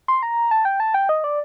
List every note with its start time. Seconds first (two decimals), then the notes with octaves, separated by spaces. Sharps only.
0.08 C6
0.23 A#5
0.51 A5
0.65 G5
0.80 A5
0.94 G5
1.09 D#5
1.24 D5